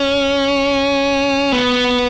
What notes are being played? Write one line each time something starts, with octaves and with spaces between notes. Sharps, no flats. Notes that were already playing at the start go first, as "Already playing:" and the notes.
Already playing: C#4
B3